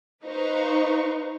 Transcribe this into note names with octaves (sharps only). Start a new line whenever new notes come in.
D#4 B4 C5 F5 A#5 C#6